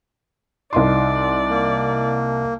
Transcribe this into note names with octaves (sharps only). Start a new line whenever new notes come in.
C2 D#4 D5 C6
A#3